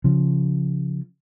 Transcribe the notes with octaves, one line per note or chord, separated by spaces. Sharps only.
C#3 F3